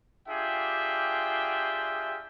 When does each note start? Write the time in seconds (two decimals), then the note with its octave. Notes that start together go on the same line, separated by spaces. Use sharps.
0.28 D4 F4 G4 G#4 E5 G5